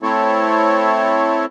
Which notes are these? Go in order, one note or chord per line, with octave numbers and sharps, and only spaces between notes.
A3 C4 E4 A4 C#5